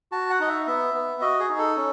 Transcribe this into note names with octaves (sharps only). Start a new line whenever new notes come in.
F#4 A5
F#5
D#4 D#5
E5
B3 E5
B3
F#4 D#5
G#4
D#4
A4
C#4